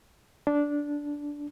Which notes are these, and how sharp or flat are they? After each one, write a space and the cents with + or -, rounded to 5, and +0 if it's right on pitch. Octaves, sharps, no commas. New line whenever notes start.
D4 -10